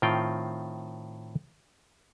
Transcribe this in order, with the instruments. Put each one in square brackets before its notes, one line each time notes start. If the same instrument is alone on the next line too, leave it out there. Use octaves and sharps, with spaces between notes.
[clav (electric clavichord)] A2 D#3 C4 F4 G5